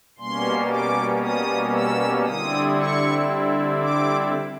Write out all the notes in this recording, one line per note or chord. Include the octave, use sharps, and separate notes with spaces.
B2 G3 A#3 C#4 C6
D6
D#6
E6
D3 G3 C4 E4 D#6
C#6
D6